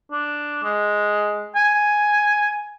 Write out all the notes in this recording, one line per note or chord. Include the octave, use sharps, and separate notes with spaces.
D4
G#3
G#5